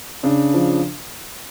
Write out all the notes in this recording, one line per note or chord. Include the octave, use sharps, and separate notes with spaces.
C#3 D4
F3